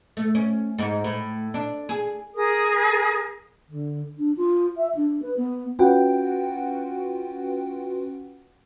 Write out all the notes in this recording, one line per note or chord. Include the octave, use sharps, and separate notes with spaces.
A3
C#4
G#2
A2
D4
G#4
G#4 A#4 D#6
D3
D4
F4
E5
D4
B4
B3
C#4 F4 F#4 B4 F#5 G5